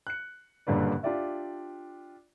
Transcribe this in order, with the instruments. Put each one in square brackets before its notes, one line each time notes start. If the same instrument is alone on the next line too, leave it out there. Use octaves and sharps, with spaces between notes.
[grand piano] F#6 C#7
F#1 G2 A#2 D3 B4 D5
D4 F4 G4 D5 E5